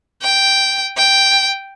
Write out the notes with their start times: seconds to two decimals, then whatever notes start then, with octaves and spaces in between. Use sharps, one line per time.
0.22 G5
0.97 G5